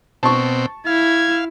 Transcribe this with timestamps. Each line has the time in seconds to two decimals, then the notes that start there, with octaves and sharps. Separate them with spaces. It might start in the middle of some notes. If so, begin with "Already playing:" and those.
0.23 B2 C4 A5 C#6
0.86 E4 F5 G#6